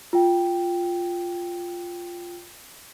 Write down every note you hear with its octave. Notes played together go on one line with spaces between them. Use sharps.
F4 G5